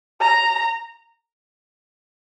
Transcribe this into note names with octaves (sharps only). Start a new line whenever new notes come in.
A#5